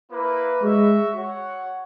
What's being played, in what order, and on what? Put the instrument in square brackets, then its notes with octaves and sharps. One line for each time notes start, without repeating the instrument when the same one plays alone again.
[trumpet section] A#3 E4 B4
[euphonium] G#3 [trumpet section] F#4 C#5 E5
[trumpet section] F#4 C#5 F#5